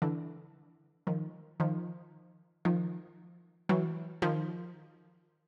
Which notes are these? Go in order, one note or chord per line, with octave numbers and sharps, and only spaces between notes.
D3 E3
D#3 F3
D#3 F3
D#3 F3
E3 F#3
D#3 F3